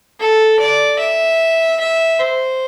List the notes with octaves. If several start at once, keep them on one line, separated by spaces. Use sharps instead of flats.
A4
D5
E5
E5
C5